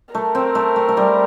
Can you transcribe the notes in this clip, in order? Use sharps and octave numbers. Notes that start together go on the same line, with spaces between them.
A3 A#4
C4
A3
A3
A3
G3